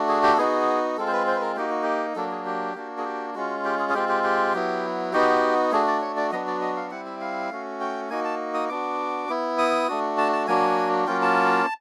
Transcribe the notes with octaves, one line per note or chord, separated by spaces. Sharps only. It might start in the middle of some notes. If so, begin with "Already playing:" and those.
Already playing: A3 D4 F#4
G#4
G4
A4
B3 D#4 F#4 G#4
G#3 C4 F4 A4
C5
B4
C5
B4
A#4
A#3 D#4 F#4 G4
F#4
G4
F#3 A#3 D4 A4
G#4
G4
A#3 D4 F#4
G#4
G4
G#3 C#4 F4 F#4
G4
G#4
G#4
G#3 C4 F4 G4
G4
G4
F#3 B3 E4
B3 D#4 F#4 G4
A3 D4 F#4 G#4
D5
C#5
D5
F#3 B3 D4 F#4 D#5
D5
D#5
F5
G3 C4 E4 F#5
E5
F5
A3 C#4 F#4
G5
A#3 D#4 F#4 G#5
A5
D#6
B3 D4 F#4 D6
B3 E4
D#6
A3 D4 F#4
A5
A5
F#3 A#3 D4 F#4 G#5
F#3 A#3 C#4 F4 G5
A5